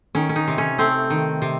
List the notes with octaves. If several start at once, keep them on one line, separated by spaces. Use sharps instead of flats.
D#3 C#4
C#4
D#4
C3
C#4
A3 C4
D#3
C3